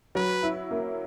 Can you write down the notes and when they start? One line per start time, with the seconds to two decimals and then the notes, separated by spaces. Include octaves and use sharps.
0.15 F#3 B4
0.43 E4
0.71 A#3